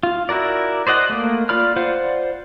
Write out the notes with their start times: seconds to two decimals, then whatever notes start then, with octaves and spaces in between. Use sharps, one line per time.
0.03 F4
0.29 E4 F#4 A#4 D5
0.87 C5 D5 D#5 F#5
1.09 A3 A#3
1.49 F4 D5 B5 F6
1.76 F4 C5 D5 F5 F#5